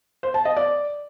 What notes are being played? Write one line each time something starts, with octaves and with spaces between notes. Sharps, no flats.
C5
A5
D#5
D5